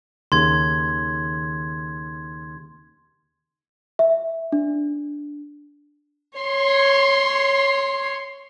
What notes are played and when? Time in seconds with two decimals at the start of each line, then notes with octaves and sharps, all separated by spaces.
0.32 D#2 C#3 C6 G#6
3.99 E5
4.52 D4
6.39 C#5 C6